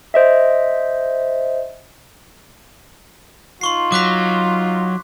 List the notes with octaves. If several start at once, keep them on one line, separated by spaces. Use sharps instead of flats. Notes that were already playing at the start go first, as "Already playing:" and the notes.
C5 D#5 E5
D#4 F4 C6 C#6 C7
F#3 D6 F#6 B6